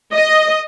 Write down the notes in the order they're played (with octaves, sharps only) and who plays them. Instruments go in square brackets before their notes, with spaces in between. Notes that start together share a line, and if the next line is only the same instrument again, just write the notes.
[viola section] D#5